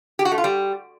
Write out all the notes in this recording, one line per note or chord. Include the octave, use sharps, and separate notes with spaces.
G4
F#4
A3
F4
G3